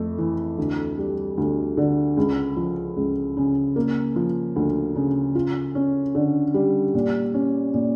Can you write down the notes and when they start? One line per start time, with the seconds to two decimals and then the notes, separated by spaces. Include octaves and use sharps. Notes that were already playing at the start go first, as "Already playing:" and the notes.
Already playing: F2 A3
0.18 E3
0.58 D2
0.98 G3
1.37 D2
1.77 D3
2.17 C#2
2.57 F3
2.97 C#2
3.37 C#3
3.76 A#3
4.16 F3
4.56 D2
4.95 C#3
5.35 F4
5.75 C#4
6.15 D3
6.54 G3
6.94 A#2
7.34 C#4
7.74 A#2